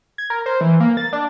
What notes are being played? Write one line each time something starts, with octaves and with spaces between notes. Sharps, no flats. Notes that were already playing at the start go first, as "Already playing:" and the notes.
G#6
A#4
C5
E3
A#3
A6
D4